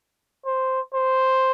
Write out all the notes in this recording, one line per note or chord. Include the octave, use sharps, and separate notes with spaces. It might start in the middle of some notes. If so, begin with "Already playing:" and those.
C5
C5